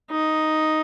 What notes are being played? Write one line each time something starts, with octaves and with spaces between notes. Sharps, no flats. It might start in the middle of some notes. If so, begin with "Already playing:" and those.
D#4